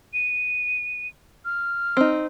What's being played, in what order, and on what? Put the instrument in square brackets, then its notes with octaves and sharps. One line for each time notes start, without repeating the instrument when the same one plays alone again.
[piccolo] D#7
F6
[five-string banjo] C4 D#4